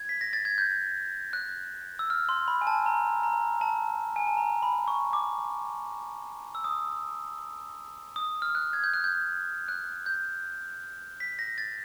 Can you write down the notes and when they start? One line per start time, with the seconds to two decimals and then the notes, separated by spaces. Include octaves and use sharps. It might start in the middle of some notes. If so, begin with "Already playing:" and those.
Already playing: G#6
0.09 B6
0.21 A#6
0.33 A6
0.45 G#6
0.58 G6
1.33 F#6
1.99 E6
2.10 F6
2.29 C6
2.48 B5
2.61 G#5
2.67 A5
2.86 A#5
3.23 A#5
3.61 A5
4.16 G#5
4.27 A5
4.37 A#5
4.63 B5
4.88 C#6
5.13 D6
6.55 E6
6.64 D#6
8.16 D#6
8.42 F6
8.55 F#6
8.73 G#6
8.84 G6
8.94 F#6
9.04 G6
9.68 F#6
10.06 G6
11.20 B6
11.39 A#6
11.58 A6